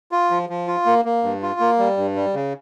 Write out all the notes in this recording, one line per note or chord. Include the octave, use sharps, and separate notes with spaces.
F4
F3
F3
F4
A#3
A#3
G2
F4
A#3
G3
G2
G3
C#3